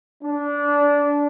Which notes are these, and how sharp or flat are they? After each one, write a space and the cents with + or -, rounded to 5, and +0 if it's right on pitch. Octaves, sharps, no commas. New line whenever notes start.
D4 -20